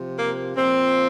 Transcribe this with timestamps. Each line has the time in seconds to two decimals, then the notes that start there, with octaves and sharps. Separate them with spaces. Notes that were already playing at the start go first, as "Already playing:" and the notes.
Already playing: C3 F3
0.16 A#3
0.56 A#2 F3 C4